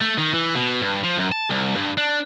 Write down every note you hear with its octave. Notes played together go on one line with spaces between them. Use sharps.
A3
D#3
E3
B2
G2
F3
F#2
A5
C2
G2
D4